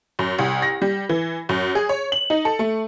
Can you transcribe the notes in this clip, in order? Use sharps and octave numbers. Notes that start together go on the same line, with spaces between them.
F#2
C2
A#6
G3
E3
F#2
G#4
C#5
F#7
D#4
A4
A3